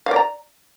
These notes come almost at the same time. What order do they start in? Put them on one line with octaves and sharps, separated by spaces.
F5 D5 A#5